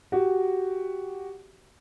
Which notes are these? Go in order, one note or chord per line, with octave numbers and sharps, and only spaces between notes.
F#4 G4